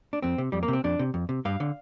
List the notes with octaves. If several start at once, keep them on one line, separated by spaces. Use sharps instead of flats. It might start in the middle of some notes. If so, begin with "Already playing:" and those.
D4
F2 C4
C3
F2 G3
A#3
C3
C4
F2 D4
C3
F2
C3
G2 F5
D3